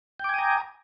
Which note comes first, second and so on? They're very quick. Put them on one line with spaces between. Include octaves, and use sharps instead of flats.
G5 D6 G#5 D#6 A#5